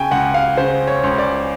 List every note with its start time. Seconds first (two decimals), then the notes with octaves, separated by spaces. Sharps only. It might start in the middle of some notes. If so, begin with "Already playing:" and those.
Already playing: C#3 G5 G#5 C#6
0.11 C#2 F#5
0.34 F5
0.57 C#3 C5
0.87 C#5
1.04 C#2
1.18 D5